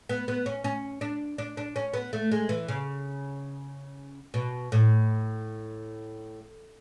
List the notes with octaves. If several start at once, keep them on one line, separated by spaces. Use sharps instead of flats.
B3
B3
C#4
C#4
D4
D4
D4
C#4
B3
A3
G#3
E3
C#3
B2
A2